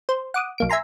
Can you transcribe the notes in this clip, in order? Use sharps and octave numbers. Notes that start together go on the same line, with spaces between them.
C5
F#5 D6 D#6
B1 A#3 D7
E5 G#5 A#5 C6